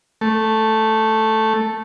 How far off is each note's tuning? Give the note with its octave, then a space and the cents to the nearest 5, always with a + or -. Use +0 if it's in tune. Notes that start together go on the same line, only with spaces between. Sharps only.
A3 +0